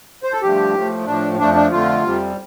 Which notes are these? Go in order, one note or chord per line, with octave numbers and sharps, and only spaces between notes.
C5
A4
G2 D3 F3 A3 G4
A2 F3 A3
A2 F3 A3 D4
F2 F3 A3 D4
D4
F2 D3 A3 F4
F2 C3 G3